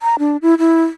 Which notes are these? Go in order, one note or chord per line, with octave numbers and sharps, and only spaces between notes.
A#5
D4
E4
E4